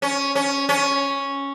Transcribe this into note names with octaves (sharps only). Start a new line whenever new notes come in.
C#4
C#4
C#4